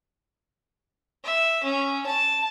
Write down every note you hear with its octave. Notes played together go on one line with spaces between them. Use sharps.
E5
C#4
A5